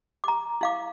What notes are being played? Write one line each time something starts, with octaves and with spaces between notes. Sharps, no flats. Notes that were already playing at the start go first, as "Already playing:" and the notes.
A#5 D6
E4 F5 D6